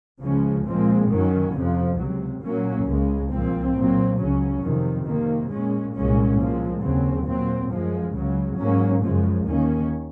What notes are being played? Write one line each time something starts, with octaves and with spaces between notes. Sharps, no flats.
C#2 C#3 F3 G#3 C#4
A#2 F3 G#3 C4
F#2 D#3 F#3 C#4
F2 C3 F3
C#2 C3 F#3
A#2 F#3 A#3 C#4
C#2 C#3 G#3
C2 A#2 F3 C4
A#2 F#3 C4
C#2 C#3 F#3 C#4
F2 C3 D#3
C3 D#3 A#3
A#2 G#3 C#4
C2 A#2 G#3 C#4
A#2 F3 G#3
D#2 C#3 F#3 C4
A#2 F#3 C4
F#2 F3 G#3
C#2 C#3 F#3
G#2 F#3 A#3 C#4
F#2 C#3 F3 G#3
D#2 D#3 A#3 C#4